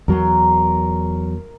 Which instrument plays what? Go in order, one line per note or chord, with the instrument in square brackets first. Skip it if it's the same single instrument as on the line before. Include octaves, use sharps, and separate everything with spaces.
[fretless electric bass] E2 F#3 [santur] A#4 A#5 C6